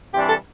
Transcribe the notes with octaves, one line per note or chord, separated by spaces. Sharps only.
C3 E3 G3 D4 G4
A4